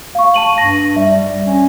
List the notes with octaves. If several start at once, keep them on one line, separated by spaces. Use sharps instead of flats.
F5 C#6
A5 D#7 F#7
G2 A#6
G3 E5
C#4